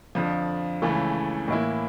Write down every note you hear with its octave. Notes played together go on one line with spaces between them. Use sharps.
F2 D3 F3
C#2 C#3 E3 A3
A2 E3 A#3 E4